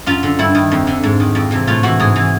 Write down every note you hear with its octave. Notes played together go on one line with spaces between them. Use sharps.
F#2 F4
D3
G2 E4
D#3
F2
D3
G#2
D#3
F2
C3 E3
A2 F4
E3 F#4
G#2 G#4
E3